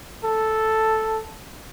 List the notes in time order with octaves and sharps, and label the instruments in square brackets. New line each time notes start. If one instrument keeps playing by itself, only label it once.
[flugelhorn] A4